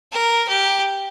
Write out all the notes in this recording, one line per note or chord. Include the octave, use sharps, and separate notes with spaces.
A#4
G4